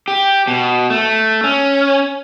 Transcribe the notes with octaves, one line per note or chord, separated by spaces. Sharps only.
G4
B2
A3
C#4